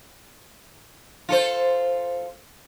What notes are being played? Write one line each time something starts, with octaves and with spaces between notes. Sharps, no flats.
F4 A4 C5